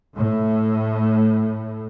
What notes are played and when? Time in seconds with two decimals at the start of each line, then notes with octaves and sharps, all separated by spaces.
0.16 A2